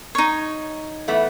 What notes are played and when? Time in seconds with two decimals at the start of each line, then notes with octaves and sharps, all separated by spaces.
0.15 D#4 C#5
1.08 E3 A3 B3